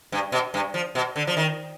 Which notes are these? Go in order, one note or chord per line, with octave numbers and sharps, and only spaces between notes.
G2
B2
G2
F3
B2
D3
F3
D#3